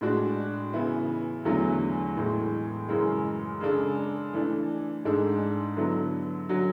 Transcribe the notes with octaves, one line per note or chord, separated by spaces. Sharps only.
A2 G#3 D4 F#4
C#3 E3 B3 E4
E2 D3 F#3 A3 E4
A2 E3 G#3
F#2 C#3 E3 G#3
C#3 G#3 D4 A4
E3 A3 D4
G#2 G#3 D4 A4
D3 F#3 B3 E4 A4
D3 F#3 C#4 F#4